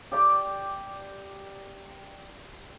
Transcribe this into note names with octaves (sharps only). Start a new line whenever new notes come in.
G4 D5 G5 D6